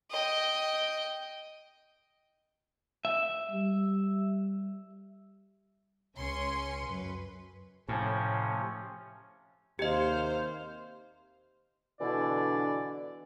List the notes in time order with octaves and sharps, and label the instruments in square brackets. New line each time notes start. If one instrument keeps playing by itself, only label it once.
[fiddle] D#5 G5
[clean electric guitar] E5
[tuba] G3
[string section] C#2 C#4 G#5 C6 C#7
F#2 B4
[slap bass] A2 [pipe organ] C3 F3 C#4
[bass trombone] D#2 [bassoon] C3 [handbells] G4 D#5 [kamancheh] C5 F5
[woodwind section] B2 D3 E3 D4 E4 D5